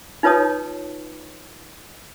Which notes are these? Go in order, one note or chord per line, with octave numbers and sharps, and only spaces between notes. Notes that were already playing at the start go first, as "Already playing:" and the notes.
D#4 F4 B4 C#5 A5 D#6